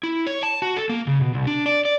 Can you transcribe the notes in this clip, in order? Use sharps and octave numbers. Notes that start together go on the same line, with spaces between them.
E4
C#5
A5
F#4
A4
A#3
C#3
B2
C2
D4
D5
D5